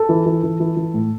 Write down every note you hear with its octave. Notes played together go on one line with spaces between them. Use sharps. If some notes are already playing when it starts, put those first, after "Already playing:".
Already playing: A4
E3
E3
E3
E3
E3
A2